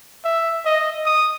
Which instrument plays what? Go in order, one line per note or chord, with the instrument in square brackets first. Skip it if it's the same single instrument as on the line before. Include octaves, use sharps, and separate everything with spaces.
[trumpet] E5
D#5
D#6